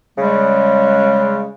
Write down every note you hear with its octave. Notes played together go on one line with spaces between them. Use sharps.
C#3 G3 G#3